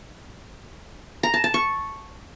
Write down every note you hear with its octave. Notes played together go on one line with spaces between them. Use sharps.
A#5
A5
A5
C#6